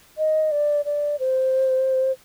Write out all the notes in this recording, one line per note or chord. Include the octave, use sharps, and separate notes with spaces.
D#5
D5
D5
C5